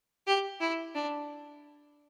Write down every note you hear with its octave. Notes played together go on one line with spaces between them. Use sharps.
G4
E4
D4